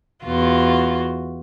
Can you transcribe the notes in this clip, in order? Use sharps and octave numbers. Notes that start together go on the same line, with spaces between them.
E2 F4 F#4